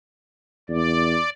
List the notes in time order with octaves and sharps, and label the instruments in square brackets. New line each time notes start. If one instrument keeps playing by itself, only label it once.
[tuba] E2 [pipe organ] D5